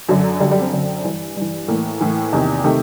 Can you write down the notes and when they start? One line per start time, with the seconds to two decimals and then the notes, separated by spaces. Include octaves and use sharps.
0.09 F#2 D3 F#3
0.40 D3 G3
0.45 F#2
0.51 G3
0.62 C4
0.73 F#2 D3
1.04 G2 E3
1.36 G2 E3
1.68 A2 E3 A#3
2.00 A2 E3
2.33 E2 C3 D#3
2.64 C3 D#3 A3